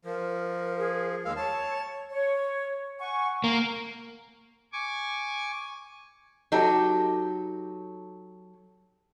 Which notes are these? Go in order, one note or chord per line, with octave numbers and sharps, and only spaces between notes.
F3 A#4
G#4
D#2 G#3 F5 E6
C#5 A5
C#5
F#5 G#5 C#6
A#3 A#5
G#5 C#6 D6
F#3 D#4 G4 A4